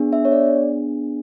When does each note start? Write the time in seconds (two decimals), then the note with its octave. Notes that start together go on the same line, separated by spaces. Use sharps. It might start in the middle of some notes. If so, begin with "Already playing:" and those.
Already playing: B3 D4 G#4
0.13 E5
0.25 C#5
0.32 D5